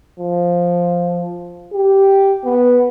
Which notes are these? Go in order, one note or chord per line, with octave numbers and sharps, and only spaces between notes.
F3
G4
B3